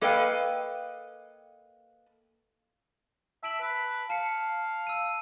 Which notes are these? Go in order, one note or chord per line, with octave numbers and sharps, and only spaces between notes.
A#3 A4 B4 D#5 F5 G5
E5 A5 D7 F#7
B4
F5 A5 C7 C#7
E6 D#7